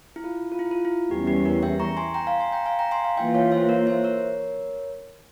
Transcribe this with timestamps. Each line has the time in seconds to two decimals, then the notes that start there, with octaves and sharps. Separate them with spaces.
0.16 E4
0.24 F4
0.52 F4
0.59 E4
0.71 F4
0.85 E4
1.11 E2 E3 G3 C#4 G4
1.27 G4
1.45 G4 A#4
1.63 E5 G5
1.80 A#5 C#6
1.97 G#5 C6
2.14 G5 A#5
2.27 F5 G#5
2.40 G#5 C6
2.52 G5 A#5
2.66 F5 G#5
2.79 G5 A#5
2.91 G#5 C6
3.04 F5 G#5
3.17 E3 A#3 F4 E5 G5
3.34 C#5 F5
3.52 C5 E5
3.69 A#4 C#5
3.87 C5 E5
4.04 A#4 C#5